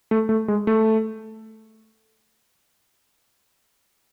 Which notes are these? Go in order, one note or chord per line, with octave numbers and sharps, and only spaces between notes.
A3
A3
G#3
A3